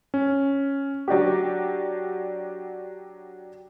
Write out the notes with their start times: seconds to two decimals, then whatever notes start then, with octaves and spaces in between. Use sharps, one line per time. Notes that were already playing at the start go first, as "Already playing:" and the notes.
0.14 C#4
1.08 F#3 D4 F#4 G4